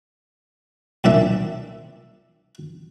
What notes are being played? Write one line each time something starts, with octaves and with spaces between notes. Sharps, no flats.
C2 A#2 D4 E5